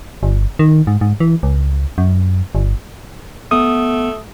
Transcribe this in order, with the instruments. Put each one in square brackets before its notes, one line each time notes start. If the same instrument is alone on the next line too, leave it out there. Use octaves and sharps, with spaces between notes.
[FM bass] G1
D#3
G#2
G#2
E3
C#2
F#2
G1
[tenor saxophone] A3 [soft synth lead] B3 [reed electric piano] D#6